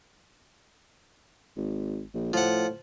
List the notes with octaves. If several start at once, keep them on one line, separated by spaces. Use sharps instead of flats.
G#1
A#1
A2 F3 F#5